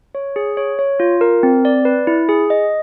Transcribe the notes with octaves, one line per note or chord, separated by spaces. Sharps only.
C#5
G#4
C#5
C#5
F4
A#4
C4
D5
B4
E4
G#4
D#5